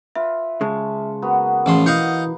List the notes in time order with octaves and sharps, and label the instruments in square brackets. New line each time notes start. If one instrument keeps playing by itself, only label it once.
[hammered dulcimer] F4 B4 [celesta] E5
[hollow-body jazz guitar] C#3 G#3 [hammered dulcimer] A5 C#6
[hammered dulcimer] A#3 B3 F#4
[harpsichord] A1 F3 C6 [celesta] G#4
[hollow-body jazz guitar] E3 [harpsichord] D#5 F5 F#5 [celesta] D#6 G6